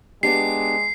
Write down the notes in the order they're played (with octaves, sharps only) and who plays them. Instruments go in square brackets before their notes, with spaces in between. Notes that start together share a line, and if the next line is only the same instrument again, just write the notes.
[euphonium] G#3 [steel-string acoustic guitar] B3 D4 G4 [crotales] C7